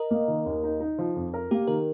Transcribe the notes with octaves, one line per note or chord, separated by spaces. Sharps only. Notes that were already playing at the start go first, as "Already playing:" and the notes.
Already playing: A#4 D#5
A#3
D#3
D#2
D#4
D#4
F3
F2
A#4
A#3 G4
D#3 A#4